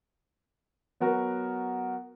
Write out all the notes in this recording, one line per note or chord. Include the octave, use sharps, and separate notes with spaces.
F#3 B3 F#4 A#4